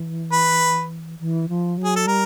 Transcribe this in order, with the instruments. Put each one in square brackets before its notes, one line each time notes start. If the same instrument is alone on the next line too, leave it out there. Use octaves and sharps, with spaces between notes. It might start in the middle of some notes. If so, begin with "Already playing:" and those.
Already playing: [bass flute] E3
[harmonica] B4
[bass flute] E3
F3
F#3
[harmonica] G#4
A4
[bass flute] G3 [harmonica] A#4